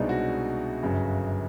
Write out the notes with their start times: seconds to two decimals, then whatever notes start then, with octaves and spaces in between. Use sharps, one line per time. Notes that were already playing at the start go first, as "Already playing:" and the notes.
Already playing: C2 B2 G#3 D4 D#4
0.09 F#4
0.83 G1 F#2 C#3